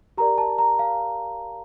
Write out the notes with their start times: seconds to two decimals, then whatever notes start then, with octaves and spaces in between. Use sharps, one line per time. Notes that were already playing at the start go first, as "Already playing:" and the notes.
0.17 G4 A#4 D5 A#5
0.38 A5
0.59 A#5
0.79 F5